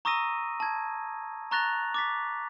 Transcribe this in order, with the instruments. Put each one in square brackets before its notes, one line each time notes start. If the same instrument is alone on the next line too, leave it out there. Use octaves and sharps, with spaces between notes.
[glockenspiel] A#5 C#6 D#6 E6 A#6 D#7
A5 G#6
A#5 C#6 F#6 A6 A#6 F7
D6 A6 B6